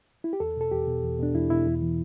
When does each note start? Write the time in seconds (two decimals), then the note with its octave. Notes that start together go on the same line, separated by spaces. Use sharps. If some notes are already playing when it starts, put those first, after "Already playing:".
0.24 E4
0.33 G4
0.40 E2 A4
0.57 B2 A4
0.71 E2 G4
0.87 B2
1.03 E2
1.19 B2 D4
1.35 E2 E4
1.50 B2 E4
1.66 E2
1.82 E3